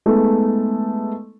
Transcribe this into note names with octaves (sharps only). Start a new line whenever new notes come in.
G#3 A3 B3 D#4 A4